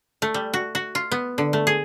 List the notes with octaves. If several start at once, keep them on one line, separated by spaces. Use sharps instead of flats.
A3
G3
F#4
F#4
F4
B3
D3
A3
G#4